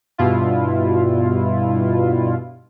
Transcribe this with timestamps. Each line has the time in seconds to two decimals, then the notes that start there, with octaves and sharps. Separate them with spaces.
0.18 G2 B2 E4 F4